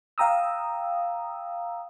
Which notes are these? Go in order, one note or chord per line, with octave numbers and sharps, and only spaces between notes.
F5 G5 A#5 D#6 E6